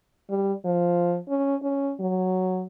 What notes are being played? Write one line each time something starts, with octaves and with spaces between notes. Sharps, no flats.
G3
F3
C#4
C#4
F#3